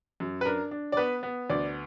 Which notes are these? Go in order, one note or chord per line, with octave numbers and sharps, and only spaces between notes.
F#2
B4
D4 A#4
D4
D5
B3 B4
B3
D2 D5